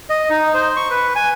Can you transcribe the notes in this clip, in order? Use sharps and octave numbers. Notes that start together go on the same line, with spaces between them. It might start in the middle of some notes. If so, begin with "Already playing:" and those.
D#5
D#4
C5
C#6
B4
G#5